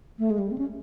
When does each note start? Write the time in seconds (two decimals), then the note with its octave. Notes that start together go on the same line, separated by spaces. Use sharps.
0.19 A3
0.30 G#3
0.38 G3
0.51 C4
0.58 C#4